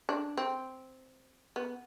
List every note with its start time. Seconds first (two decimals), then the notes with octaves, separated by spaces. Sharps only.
0.09 D4
0.37 C4
1.56 B3